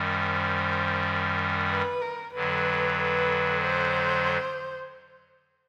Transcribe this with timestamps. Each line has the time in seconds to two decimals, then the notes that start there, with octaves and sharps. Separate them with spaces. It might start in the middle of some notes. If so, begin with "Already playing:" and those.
Already playing: F#2 D#3 G3
0.10 C5
1.70 B4
2.01 A#4
2.34 F2 D3 F#3 B4
2.97 B4
3.61 C5